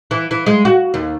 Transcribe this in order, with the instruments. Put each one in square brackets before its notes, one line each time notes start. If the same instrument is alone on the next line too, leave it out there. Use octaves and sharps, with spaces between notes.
[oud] E3
E3
G#3
F#4
D#2